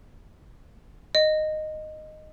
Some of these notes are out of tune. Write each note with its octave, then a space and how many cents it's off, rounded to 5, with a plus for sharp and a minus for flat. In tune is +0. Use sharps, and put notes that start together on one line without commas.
D#5 -10